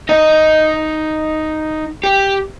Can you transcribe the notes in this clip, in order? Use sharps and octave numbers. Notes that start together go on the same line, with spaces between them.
D#4 D#5
G4